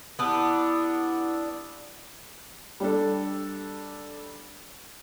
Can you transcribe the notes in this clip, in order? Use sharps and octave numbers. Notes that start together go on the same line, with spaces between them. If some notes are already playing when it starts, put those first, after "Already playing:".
B3 D4 E4 G4 E6
G3 D4 A4